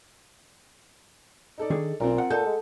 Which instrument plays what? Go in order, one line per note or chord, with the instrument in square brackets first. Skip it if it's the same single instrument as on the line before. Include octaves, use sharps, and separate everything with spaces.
[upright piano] D#4 A4 D5
[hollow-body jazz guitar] D#3 D4 G#4
[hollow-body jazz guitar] B1 [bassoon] A#2 [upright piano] C4 F4 A#4
[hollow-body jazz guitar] F#5
[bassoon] A#2 [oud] D#4 A4 [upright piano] G6
[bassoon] G#3